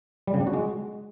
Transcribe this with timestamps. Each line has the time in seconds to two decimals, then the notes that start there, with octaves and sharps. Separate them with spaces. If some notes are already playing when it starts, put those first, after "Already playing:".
0.27 G3
0.34 C#3
0.40 D4
0.47 F#4
0.53 G#3